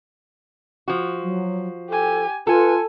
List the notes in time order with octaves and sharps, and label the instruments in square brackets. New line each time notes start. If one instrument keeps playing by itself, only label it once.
[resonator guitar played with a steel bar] F3 F#4
[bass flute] F#3
[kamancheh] G4 G#5 [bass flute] A4
[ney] F4 [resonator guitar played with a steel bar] A4 [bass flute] B4 [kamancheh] G#5